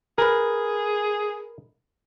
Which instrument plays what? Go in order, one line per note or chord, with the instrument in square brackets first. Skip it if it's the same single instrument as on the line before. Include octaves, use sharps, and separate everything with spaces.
[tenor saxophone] G#4 [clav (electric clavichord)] A#4 B4